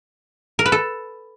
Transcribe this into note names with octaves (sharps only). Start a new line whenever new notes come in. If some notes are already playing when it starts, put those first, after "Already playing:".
A#4
B4
A4